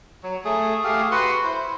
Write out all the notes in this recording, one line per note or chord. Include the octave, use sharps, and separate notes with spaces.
F#3
A3 G#4
A3 G4 G#4 F5
F#4 B4 F#5 C6
E4 C5